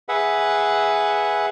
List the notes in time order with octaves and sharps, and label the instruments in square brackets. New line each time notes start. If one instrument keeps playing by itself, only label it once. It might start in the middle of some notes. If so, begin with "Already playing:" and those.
[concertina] G#4 B4 E5 F#5